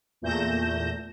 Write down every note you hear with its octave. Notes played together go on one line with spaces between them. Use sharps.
E2 A#2 A3 G6 A#6 E7